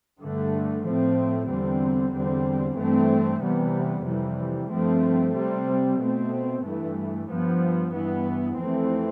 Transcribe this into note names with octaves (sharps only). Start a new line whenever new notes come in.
G2 D3 A3
A2 F3 A3 C4
E2 D3 G3 C4
E2 D3 G3 C4
G2 E3 A3 C4
C3 E3 G3 B3
F2 C3 E3 G3
G2 F3 A3 C4
C3 G3 C4
B2 A3 C4
G2 E3 A3
G2 F3 B3
G2 E3 B3
F2 E3 A3 C4